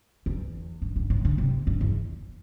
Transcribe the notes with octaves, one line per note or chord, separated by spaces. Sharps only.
E2
G2
G2
A2
D3
C3
G2
E2